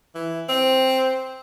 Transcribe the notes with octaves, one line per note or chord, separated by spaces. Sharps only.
E3
C4